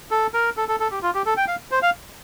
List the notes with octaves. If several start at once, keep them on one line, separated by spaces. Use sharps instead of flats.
A4
A#4
A4
A4
A4
G4
F4
G4
A4
G5
F5
C5
F5